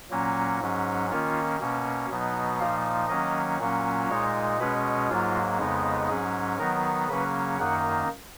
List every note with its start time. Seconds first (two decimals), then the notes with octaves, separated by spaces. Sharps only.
0.10 A#2 F#3 A#3 C#4
0.61 G#2 F#3 C#4
1.11 D#3 A#3 C#4 F4
1.60 B2 A#3 C#4
2.10 B2 F#3 B3 D#4
2.60 A#2 F3 A#3 D#4 F5
3.09 D#3 F#3 A#3 C#4 D#5
3.59 A#2 F#3 A#3 C#4
4.09 A#2 G#3 D#4 C#5
4.59 B2 G#3 C#4 B4
5.09 G#2 F#3 A#3 F4
5.59 F2 C#3 G#3 B3 D#4
6.08 G#2 F#3 C#4 G#4
6.59 D#3 F#3 B3 D#4 A#4
7.09 C#3 F#3 A#3 C#4 B4
7.58 F#2 D#3 A#3 D#4 F#5